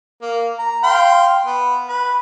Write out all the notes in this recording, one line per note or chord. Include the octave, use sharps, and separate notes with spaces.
A#3
A#5
F5 G5 C6
B3
B4